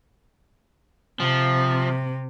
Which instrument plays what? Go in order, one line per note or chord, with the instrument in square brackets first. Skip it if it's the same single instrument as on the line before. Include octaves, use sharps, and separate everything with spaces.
[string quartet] C3 [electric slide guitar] F3